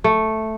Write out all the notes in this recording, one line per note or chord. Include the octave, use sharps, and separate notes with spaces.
A3